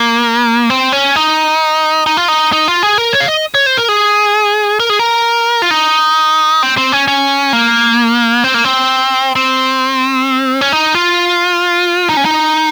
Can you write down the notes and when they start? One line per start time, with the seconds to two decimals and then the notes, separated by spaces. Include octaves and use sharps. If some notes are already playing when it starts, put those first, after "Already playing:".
Already playing: A#3
0.70 C4
0.92 C#4
1.16 D#4
2.06 D#4
2.17 F4
2.28 D#4
2.53 D#4
2.68 F4
2.83 G#4
2.98 A#4
3.13 C#5
3.20 F5
3.28 D#5
3.55 C#5
3.66 C5
3.77 A#4
3.89 G#4
4.80 A#4
4.90 G#4
4.99 A#4
5.62 F4
5.71 D#4
6.63 C4
6.77 C4
6.92 C#4
7.08 C#4
7.53 A#3
8.44 C4
8.54 A#3
8.65 C4
9.36 C4
10.61 C#4
10.72 D#4
10.95 F4
12.09 D#4
12.17 C#4
12.25 D#4